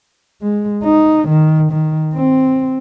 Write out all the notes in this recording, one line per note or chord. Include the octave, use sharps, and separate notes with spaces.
G#3
D#4
D#3
D#3
C4